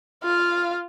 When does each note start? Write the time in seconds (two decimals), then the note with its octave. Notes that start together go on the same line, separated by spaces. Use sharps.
0.24 F4 F5